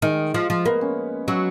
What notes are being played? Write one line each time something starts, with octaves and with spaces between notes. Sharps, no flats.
D#3 G#3
F3
F3
A#3 B3
C#4
F#3 C#4